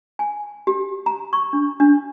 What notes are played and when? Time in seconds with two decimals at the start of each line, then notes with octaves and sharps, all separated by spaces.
0.19 G#5
0.67 G4
1.06 A#5
1.33 C#6
1.53 D4
1.80 D4